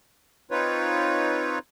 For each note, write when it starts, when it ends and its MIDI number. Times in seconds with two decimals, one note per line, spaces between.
0.51 1.59 60
0.51 1.59 63
0.51 1.59 65
0.51 1.59 71
0.51 1.59 73